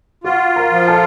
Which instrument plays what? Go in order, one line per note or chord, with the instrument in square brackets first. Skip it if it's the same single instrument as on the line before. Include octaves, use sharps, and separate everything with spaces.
[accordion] F4 [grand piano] F#4
[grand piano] A#4
[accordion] F3
[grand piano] A4